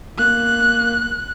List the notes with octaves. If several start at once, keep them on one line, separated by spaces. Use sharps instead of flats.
A#3 F#6